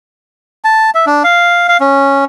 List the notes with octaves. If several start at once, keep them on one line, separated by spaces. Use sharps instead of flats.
A5
E5
D4
F5
F5
C#4